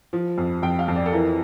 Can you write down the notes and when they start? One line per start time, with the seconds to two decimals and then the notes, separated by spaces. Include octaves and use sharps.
0.13 F3
0.38 F2
0.63 F2 G5
0.79 F5
0.88 F2
0.96 D5
1.06 A4
1.13 E3 A#4